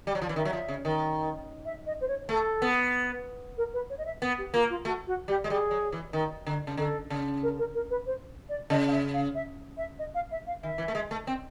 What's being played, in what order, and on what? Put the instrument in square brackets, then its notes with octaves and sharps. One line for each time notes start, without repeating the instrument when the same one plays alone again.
[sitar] G3
F#3
F3
E3
[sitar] D#3 [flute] E5
[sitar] F#3
F3
C#3
D#3
[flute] E5
D#5
C5
C#5
[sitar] A3 [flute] A4
[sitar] B3
[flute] A#4
B4
C#5
D#5
E5
[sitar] B3
[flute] G4
[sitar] A#3 [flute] F4
[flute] F4
[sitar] A3 [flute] F#4
[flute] F#4
[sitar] G3 [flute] G4
[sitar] G#3
[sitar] G3 [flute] G#4
[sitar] F#3
E3
D#3
D3
C#3
[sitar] D3 [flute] A4
[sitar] C#3
[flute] A#4
A#4
A#4
B4
C5
D5
[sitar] C#3 [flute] D#5
[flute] F5
E5
F5
E5
E5
D#5
F5
E5
F5
[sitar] D#3 [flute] E5
[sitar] E3
A3
G#3
A3
C4